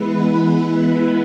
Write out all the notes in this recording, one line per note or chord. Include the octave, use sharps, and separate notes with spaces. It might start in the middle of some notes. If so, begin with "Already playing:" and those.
Already playing: E3 G#3 B3 E4 B4